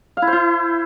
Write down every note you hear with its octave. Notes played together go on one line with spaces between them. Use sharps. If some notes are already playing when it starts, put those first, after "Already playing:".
F5
E4
C5
E4